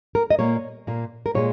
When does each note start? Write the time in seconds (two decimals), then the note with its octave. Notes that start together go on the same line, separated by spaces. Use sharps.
0.15 A#4
0.30 D#5
0.39 A#2 A#3 C#5
0.87 A#2 A#3
1.26 A#4
1.35 A#2 G#3 C#5